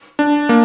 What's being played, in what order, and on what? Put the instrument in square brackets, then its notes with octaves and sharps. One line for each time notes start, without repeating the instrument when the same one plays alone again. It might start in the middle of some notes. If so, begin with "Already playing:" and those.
[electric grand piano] D4
A#3